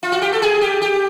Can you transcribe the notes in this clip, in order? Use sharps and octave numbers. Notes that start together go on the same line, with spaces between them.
F4
F#4
G4
A4
G#4
G4
G4